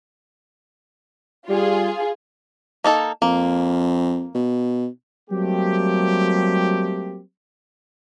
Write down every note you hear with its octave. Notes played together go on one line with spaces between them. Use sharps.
G3 F4 G#4
A#3 D#4 A4
F2 A#3
B2
F#3 G3 A3 A#3 C4 G4